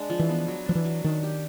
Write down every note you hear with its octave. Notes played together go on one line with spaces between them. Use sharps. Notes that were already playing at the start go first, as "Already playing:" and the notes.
Already playing: G#3 D4
F3
E3
B3
F#3
F3 D4
E3
F#3
D#3 D4
G4